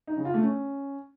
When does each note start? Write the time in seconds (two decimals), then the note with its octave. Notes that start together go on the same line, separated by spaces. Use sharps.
0.07 D#4
0.16 C#3
0.25 F4
0.34 A3
0.43 C#4